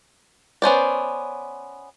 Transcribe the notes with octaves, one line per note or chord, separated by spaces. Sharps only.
B3 C#4 C5 D5